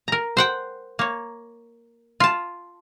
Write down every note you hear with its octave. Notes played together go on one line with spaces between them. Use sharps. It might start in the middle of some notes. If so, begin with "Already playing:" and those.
A#4 A#5
C5 F#5 G5
A#3 C#5
F4 A5